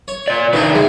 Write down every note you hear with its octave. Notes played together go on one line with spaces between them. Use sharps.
C#5
A#2 D5
C3 D#3 D4 D#4 B4
E2 G#3